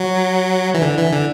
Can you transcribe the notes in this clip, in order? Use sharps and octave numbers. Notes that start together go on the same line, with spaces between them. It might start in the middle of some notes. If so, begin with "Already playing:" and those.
Already playing: F#3
E3
D3
E3
D3